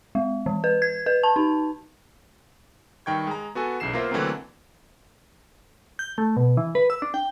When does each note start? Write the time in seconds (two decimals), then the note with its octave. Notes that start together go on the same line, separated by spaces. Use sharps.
0.15 G#3
0.46 E3
0.64 B4
0.82 G#6
1.06 B4
1.23 A5
1.36 D#4
3.06 G2 D#3 G5 C#6 G#6
3.27 G#3 A#5
3.55 B3 F#4 A4 G#5
3.80 B1 C#3 E3 C7 E7
3.93 A#3 B3 F4 A#4 C5 E5
4.11 D3 E3 F#3 A3 A#3 C4
5.99 G6
6.18 A3
6.36 B2
6.57 E3
6.75 B4
6.90 E6
7.02 D4
7.14 G5